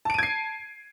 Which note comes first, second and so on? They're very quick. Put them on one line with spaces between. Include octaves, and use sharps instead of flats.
A5 D7 D#7 G#6 C7